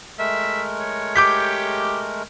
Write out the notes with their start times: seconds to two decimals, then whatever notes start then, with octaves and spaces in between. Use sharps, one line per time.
0.19 G#3 A3 A#4 E5
0.80 C#5
1.16 G4 D6 G6 B6